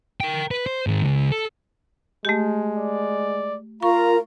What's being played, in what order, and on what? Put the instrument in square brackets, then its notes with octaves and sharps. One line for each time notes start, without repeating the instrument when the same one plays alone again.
[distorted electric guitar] A#4 G5
B4
C5
G#2 D#3
C#2
A4
[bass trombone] G#3 [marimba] A3 G4
[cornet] D5
[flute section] F4 A#4 F5 [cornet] A#5 [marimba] C#6